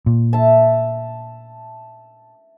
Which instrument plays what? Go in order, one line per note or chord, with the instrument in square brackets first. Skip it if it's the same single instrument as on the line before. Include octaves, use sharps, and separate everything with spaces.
[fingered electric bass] A#2
[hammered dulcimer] E5 A5